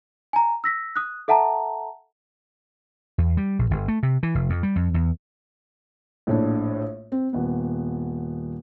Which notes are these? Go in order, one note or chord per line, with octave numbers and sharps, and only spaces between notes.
G#5 A#5
E6 A#6 B6
D#6 F#6
A4 E5 F#5 A5 A#5
E2
G3
A#1
G1
A3
C3
E3
F1
F2
G3
F2
E2
A#1 A2 D4
C4
D#1 B3